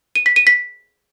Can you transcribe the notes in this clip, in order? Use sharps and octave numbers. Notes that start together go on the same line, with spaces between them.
D#7
B6
D#7
B6